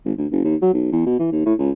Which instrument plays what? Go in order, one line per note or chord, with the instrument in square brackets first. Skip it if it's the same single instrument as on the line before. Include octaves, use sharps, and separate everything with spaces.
[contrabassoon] G#1
D2
F#1
D#2
F#3
B1
E2
B2
E3
D#2
A2
C#2